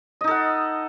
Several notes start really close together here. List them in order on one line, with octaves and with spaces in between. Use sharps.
D#5 D#4 A4 F#5